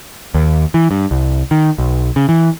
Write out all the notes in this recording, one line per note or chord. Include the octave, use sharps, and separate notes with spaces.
D#2
E3
G2
C2
D#3
B1
C#3
E3